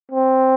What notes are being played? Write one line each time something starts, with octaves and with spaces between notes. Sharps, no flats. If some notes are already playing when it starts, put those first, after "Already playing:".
C4